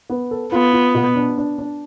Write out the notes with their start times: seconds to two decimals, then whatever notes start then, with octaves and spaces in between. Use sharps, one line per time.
0.10 B3
0.31 A4
0.52 B3 F4
0.73 F4
0.95 B2
1.15 D4
1.38 D4
1.58 D4